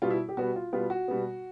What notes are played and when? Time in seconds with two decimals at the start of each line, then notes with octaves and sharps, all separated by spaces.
0.02 B2 G3 B3 F4
0.10 E4
0.29 G4
0.37 B2 G3 B3 F#4
0.56 F4
0.73 B2 G3 B3 F4
0.90 F#4
1.08 B2 G3 B3